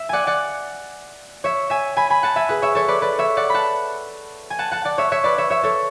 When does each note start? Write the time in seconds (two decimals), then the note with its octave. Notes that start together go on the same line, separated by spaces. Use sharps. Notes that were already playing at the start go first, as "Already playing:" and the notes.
Already playing: E5
0.09 D5 F#5 G#5
0.27 D5 F#5
1.44 C#5 E5
1.70 E5 G#5
1.97 G#5 B5
2.10 G#5 B5
2.23 F#5 A5
2.36 E5 G#5
2.49 G#4 B4
2.62 C#5 E5
2.75 A4 C#5
2.88 B4 D5
3.02 B4 D5
3.18 C#5 E5
3.37 D5 F#5
3.50 F#5 A5 B5
4.50 G#5
4.59 F#5 A5
4.71 F#5 A5
4.85 D5 F#5
4.98 C#5 E5
5.12 C#5 E5
5.24 B4 D5
5.38 C#5 E5
5.50 C#5 E5
5.63 A4 C#5